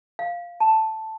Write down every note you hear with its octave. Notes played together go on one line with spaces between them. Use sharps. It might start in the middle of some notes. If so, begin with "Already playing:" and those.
F5
A5